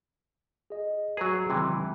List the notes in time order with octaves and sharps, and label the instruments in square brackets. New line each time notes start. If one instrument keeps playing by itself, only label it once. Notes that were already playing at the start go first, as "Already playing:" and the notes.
[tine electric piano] G#4 D#5
[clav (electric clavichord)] F#3 G#4 [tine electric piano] B4 A#5
[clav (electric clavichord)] C3 E3 [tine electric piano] D#3 F#3 G#3